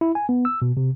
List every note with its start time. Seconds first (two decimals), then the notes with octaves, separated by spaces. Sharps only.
0.01 E4
0.15 G#5
0.29 B3
0.45 E6
0.62 B2
0.77 C3